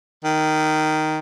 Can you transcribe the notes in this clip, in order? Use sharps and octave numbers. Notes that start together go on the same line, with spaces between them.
D#3